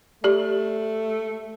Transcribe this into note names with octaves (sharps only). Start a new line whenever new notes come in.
A3 G4 D5